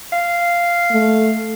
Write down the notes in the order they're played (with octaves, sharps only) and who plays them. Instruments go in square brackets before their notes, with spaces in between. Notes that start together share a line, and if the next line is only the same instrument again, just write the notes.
[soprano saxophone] F5
[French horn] A3